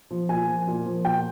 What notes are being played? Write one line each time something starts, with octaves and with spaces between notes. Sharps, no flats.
F3
A#2 G#5
F3
A#2
F3
A#2 G5